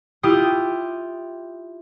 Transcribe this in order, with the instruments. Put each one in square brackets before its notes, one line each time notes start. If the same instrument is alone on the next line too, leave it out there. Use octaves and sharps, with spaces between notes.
[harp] E4 F4 G4 G5 D#6